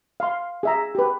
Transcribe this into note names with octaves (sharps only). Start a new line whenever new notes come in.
F5 C6
G#4 E5 A#5
G4 B4